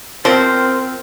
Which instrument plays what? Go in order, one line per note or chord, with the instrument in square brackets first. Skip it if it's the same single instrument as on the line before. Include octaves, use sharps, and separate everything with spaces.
[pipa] F3 [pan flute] C4 [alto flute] A#4 [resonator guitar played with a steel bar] C5